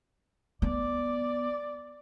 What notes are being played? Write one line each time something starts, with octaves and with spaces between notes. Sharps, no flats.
B3 D5